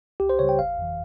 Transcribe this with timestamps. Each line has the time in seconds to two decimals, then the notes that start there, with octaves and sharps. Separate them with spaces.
0.20 C#2 G4
0.30 C5
0.39 C#3 G3 C#5
0.49 G5
0.59 G1 F5
0.78 F2 E3